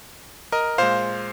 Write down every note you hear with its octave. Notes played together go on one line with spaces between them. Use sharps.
A#4 D#5
A#2 G#3 C5 F5